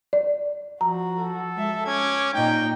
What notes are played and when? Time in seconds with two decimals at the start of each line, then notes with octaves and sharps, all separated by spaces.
0.13 D5
0.81 F3 F#4 A#5
1.19 A4
1.55 G#3 E5
1.86 C#4 D6 G#6
2.34 A#2 D#4 D#5 G5